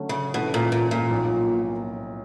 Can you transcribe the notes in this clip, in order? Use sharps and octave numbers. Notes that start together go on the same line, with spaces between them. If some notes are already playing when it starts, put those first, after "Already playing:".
Already playing: D3 F#3 A3 C#4
C#3
G#2 B2 E3 A3 C#4 F#4
A#2
A#2
A#2
B1 A2 F3 A#3